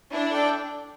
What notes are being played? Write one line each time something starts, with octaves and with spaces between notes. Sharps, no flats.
D4 E4
A4 D5 G5